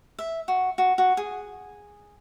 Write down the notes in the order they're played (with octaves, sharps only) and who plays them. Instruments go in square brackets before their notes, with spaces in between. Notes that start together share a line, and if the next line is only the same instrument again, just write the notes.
[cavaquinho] E5
F#4
F#4
F#4
G#4